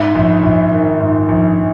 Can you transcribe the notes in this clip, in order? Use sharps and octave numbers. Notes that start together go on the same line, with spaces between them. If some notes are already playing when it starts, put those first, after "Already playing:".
Already playing: G#2 E5
A#1
A#1
D#3
G#2
A#1